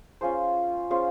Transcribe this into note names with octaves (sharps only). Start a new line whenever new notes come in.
C#4 F4 G#4 C5
C#4 F4 G#4 C5